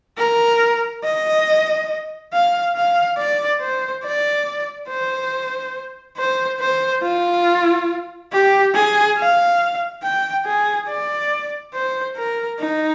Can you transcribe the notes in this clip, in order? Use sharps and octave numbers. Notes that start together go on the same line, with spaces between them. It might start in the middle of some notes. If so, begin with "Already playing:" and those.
A#4
D#5
F5
F5
D5
C5
D5
C5
C5
C5
F4
G4
G#4
F5
G5
G#4
D5
C5
A#4
D#4